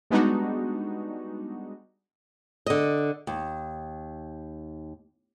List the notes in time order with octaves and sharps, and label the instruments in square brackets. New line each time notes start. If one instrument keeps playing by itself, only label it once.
[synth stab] G3 G#3 B3 D4 D#4 F#4
[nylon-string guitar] D3 D#5
D#2